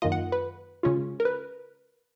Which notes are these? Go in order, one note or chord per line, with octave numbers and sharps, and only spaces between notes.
F#2 D#3 A#3 F4 D#5
F#5
B4
C#3 G#3 C#4 F4
A#4
B4